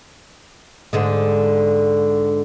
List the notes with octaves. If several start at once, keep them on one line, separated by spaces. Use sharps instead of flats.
G#2 D3 G#3